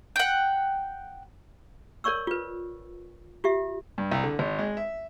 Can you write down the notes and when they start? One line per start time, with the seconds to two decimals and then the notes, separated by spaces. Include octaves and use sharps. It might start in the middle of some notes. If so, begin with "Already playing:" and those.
0.16 F#5 G5
2.04 A#4 C#5 D5 C#6 E6
2.27 F4 B4
3.44 F4 G4 E5
3.98 G2
4.12 C2
4.24 D3
4.39 G#1
4.59 G#3
4.77 E5